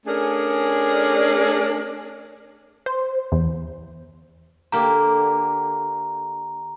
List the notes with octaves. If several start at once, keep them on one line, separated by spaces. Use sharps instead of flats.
A3 C#4 D4 G#4 A#4
C5
E2
D3 A#3 G4 A#5